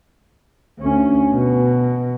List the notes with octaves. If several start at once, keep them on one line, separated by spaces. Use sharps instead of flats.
D2 C#4
B2